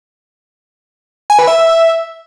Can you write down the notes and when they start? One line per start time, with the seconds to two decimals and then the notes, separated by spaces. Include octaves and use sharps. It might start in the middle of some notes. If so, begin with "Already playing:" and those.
1.30 G#5
1.39 B4
1.47 E5